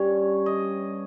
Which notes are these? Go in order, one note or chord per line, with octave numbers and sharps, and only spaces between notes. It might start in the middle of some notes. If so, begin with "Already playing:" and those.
Already playing: G2 G3 C#4 C#5
D#5